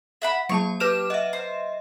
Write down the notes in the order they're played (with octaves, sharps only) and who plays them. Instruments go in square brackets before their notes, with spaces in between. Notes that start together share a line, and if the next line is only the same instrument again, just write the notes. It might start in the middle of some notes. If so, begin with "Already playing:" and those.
[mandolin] E5 F#5 B5
[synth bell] F#3 A#3 A5 [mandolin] C#6
[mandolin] G4 [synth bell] B4 F6 E7
[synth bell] D#5 E5 [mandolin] F#5
[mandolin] C5